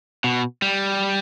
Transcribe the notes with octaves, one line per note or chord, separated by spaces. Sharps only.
B2
G3